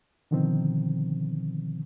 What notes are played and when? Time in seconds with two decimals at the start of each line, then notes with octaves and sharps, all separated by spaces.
0.31 B2 D3 D#3 F3 C4